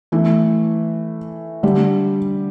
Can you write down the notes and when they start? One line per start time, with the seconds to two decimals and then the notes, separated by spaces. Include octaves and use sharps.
0.12 E3 A3
1.63 D3 G3